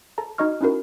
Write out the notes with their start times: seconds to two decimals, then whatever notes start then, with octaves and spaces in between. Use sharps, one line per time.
0.18 A4 A5 A#5
0.38 D#4 F#4 D#5 C#6 F6
0.61 C#4 D#4 E4 F#4 A#4